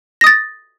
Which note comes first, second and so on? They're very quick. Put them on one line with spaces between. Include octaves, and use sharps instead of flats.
A#6 D#6 A6